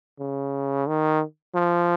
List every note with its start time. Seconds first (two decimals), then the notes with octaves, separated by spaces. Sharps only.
0.19 C#3
0.87 D#3
1.55 F3